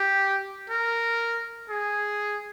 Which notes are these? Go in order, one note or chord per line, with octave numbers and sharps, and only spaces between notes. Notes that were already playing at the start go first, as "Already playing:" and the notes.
Already playing: G4
A#4
G#4